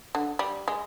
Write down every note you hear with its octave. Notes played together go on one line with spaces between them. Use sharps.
D3
G3
G#3